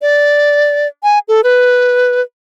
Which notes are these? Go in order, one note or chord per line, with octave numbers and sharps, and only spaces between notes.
D5
G#5
A4
B4